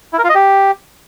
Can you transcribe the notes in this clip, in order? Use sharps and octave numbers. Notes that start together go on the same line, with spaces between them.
E4
A#4
F4
D#5
G4